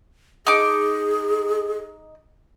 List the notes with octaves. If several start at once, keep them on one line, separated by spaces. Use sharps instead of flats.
D#4 G#4 D6